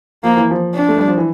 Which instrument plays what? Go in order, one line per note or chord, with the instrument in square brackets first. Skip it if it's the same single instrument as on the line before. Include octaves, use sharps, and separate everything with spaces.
[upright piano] F3 [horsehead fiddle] A#3
[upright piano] E3
F3
[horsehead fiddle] D4
[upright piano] A3
G3
F3
E3